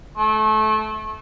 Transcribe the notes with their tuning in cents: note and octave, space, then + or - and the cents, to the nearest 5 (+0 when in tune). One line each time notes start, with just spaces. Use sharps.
A3 -25